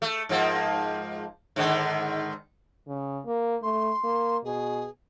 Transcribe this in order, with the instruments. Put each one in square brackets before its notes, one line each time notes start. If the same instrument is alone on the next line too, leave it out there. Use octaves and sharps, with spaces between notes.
[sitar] A3
G#2 F3 A#3
G#2 D3 D#3
[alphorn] C#3
A#3
[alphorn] A3 [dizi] C6
[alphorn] A#3
[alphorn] B2 [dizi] G#4